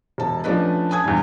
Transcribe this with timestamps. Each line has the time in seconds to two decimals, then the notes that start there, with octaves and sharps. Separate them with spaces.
0.18 E1 A5
0.44 F3 A3 C#4 D4 B4 D#5
0.91 G#5 A5 D#6 G#6
1.04 E2 G2